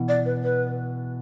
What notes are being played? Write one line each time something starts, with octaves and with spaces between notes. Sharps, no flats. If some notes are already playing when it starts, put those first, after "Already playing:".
Already playing: B2 E3
D5
B4
B4